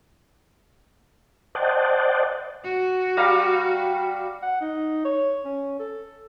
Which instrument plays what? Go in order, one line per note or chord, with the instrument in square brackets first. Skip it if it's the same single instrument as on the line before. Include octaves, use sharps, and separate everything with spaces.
[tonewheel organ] C5 D5 D#5 F#5 G5 A5
[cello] F#4
[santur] G3 F5 A#5
[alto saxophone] F#5
D#4
C#5
C#4
A4